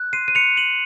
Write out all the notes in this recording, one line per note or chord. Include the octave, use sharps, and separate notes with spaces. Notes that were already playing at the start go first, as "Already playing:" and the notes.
Already playing: F#6
C6 C7 D#7
D#7
C6 C#7 F7
F#6 D#7 F#7